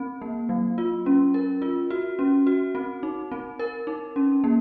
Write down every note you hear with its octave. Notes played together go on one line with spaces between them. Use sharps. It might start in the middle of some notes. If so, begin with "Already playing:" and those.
Already playing: C4
A#3
F#3
F4
C#4
A#4
F4
F#4
C#4
F#4
C4
D#4
C4
A#4
D#4
C#4
A#3